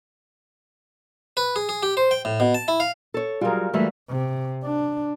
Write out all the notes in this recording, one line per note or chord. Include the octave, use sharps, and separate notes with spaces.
B4
G#4
G#4
G4
C5
G5
A2
B2
A5
E4
F5
A4 C#5
F#3 G3 F4 G#4 A#4
E3 F#3 G3 A3 A#3 E5
C3
D4